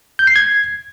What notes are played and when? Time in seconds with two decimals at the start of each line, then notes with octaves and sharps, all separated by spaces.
0.19 G6
0.27 C7
0.36 G#6